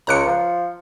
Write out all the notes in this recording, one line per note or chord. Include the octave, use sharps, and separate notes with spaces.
C#2 A#5 F#6 C#7
F3